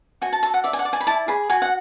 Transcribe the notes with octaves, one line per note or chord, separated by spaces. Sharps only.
F#4 G#5
A5
A4 A5
F#5
D5 E5
G#5
F#5
D5
G#5
B5
E4 A5
G#4 B5
F#4 G#5
F#5